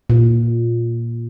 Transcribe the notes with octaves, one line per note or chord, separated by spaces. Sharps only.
A#2